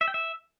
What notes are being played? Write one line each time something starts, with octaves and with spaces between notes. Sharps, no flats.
E5
G5
E5